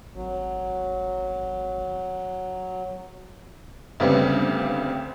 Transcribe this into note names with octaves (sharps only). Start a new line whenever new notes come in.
G#1 F#3
D2 C#3 G3 B3 C4